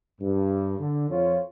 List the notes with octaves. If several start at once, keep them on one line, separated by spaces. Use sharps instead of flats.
G2
D3
F2 F4 C#5